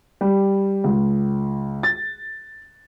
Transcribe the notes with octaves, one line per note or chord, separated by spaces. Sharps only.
G3
C#2
A6